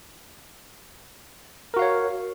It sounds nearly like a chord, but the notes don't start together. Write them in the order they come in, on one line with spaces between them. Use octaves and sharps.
A#4 F#4 F5 C#5